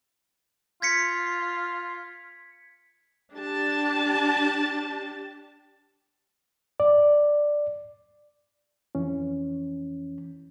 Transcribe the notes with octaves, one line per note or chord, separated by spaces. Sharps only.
F4 G#6 B6 C#7
D4 G4 A5
D5
F2 E3 C#4